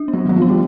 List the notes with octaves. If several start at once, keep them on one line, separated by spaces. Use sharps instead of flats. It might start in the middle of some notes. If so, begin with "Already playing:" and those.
Already playing: D4
B3
F#3
D#3 F#3
F3
B3
G3